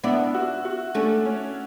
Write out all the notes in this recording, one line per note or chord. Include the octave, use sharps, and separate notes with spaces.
B3 D4 E4
F#4
F#4
A3 C#4 D4
C#4